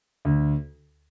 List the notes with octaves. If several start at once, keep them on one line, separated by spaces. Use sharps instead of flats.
D2